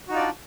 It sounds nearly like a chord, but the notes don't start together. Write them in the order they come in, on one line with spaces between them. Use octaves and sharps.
F#4 D#4 F4 D5 D4